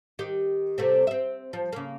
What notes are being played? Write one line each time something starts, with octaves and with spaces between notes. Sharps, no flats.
D#3 G4
C3 A3 C4
C4 E5
F3
C#3 A#3